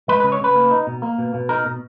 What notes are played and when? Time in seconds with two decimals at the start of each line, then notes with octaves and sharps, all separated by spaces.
0.08 G#3 B4
0.20 B4
0.24 C#3
0.32 C#5
0.41 C#3 B4
0.55 A#3
0.71 D#4
0.87 B2
1.02 A#3
1.18 B2
1.34 B2
1.49 D#4 A#4
1.66 B2